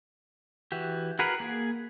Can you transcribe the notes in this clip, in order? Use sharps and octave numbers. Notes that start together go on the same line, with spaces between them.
E3 F#4 G4
F#4 G#4 A#4 B4 F#5
A#3 G#4